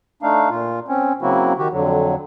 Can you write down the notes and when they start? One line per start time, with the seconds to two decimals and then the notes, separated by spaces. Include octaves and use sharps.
0.23 A3 D4 D#4 F5
0.50 A#2 F4
0.88 C4 C#4
1.22 C#3 F#3 A#3 C4 E4 F#4
1.58 D#3 F#4 G4
1.72 F2 D3 F#3